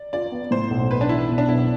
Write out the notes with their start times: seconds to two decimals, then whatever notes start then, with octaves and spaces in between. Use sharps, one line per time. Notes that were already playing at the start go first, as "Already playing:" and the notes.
Already playing: D5
0.13 F4 D5
0.32 B3
0.51 A2 C5
0.70 B1
0.90 B1 B4
1.01 D4
1.09 E3 E4
1.29 B2
1.38 D4
1.48 B1 E4